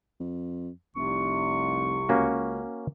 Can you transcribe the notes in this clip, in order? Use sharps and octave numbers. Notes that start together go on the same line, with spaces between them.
F2
F1 C2 C3 C#6
C#2 A#3 C#4 F#4